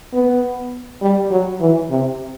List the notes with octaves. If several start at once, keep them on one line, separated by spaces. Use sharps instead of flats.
B3
G3
F#3
E3
C3